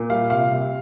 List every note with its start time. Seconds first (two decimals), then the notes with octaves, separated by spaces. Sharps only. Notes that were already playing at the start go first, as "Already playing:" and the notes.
Already playing: A#2
0.10 G3 F5
0.30 C3 F5
0.51 C3